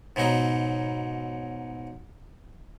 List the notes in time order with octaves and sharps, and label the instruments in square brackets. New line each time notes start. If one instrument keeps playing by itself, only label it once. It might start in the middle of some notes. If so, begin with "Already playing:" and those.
[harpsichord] G#2 B2 F#3 D#4